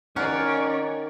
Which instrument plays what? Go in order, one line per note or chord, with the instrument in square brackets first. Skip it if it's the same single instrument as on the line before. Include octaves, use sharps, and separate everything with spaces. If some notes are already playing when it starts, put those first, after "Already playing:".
[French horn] D#3 [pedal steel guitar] C#4 [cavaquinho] A#4 F5 F#5 [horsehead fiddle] C#5 D5